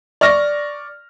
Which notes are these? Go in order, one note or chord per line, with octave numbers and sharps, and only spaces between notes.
D5 C#6 F6 A#6